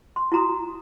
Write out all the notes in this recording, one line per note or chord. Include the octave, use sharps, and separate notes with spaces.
C6
E4 F#4 A#5 C6 D#6